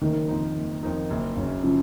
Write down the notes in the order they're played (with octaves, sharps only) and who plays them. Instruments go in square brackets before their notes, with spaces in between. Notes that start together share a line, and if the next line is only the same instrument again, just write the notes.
[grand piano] F#1 [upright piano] D#3
[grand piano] F2 F3 A#3 D#4
F#1
F2 F3 A#3 D#4
F#1
F#2 C#3
[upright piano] C#3 F3